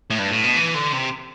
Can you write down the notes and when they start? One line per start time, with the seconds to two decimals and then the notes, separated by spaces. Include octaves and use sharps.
0.10 A2
0.19 G2
0.31 A2
0.44 B2
0.56 E3
0.74 D3
0.92 C3